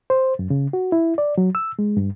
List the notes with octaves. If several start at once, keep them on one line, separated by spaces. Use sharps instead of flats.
C5
F#2
C#3
F#4
E4
D5
F#3
E6
G#3
G2